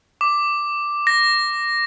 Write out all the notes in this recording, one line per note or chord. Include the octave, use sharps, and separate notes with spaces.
D6
A#6